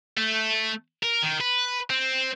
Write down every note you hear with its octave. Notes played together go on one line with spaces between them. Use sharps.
A3
A#4
D#3
B4
C4